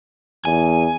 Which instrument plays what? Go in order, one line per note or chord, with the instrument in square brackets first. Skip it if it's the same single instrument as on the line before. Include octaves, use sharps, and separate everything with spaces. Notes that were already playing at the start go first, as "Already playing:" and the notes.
[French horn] E2 [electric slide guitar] G#5